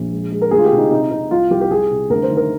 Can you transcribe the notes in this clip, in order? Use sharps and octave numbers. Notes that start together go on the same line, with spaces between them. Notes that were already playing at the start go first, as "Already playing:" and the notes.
Already playing: A#1
G#3
G#3
A#4
D2 G#4
F4
G4
C3
D#4
C3 D#4
C3 D#4
C2 F4
C2 G4
G4
C2 G#4
C3
D2 A#4
C5
D#3
A#4